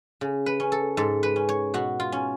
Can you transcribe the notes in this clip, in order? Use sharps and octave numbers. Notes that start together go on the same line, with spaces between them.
C#3
B4
C#4
A4
G#2 A4
B4
C#4
C#5
B2 F#4
F4
C#4